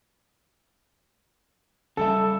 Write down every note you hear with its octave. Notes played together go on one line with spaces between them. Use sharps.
C#3 G3 A4 E5